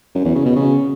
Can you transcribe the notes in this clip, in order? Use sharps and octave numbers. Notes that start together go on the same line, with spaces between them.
F#2
E2
C#3
B2
C#3